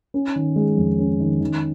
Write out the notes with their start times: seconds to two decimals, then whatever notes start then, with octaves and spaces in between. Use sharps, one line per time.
0.14 C#4
0.36 D#3
0.56 G#3
0.77 F2
0.99 C#4
1.20 D#3
1.41 D#3